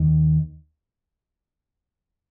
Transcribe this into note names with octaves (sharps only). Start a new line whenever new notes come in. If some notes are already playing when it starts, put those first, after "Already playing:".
Already playing: D#2 D#3